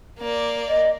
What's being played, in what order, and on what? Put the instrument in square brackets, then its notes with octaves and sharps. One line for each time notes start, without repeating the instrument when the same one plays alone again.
[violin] A#3 D5
[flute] D#5